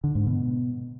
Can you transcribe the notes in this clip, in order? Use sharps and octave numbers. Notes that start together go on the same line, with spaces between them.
D3
G#2
B2